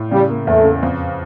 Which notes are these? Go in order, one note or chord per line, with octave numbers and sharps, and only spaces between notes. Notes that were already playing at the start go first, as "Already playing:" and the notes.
Already playing: A2
C#3 G3
A#3
E2 A3
C#3
F2